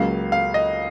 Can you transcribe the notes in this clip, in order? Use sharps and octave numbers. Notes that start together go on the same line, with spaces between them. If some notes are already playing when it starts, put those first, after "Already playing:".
Already playing: C#2 C#3 F#3 A#3 F5
F5
D#5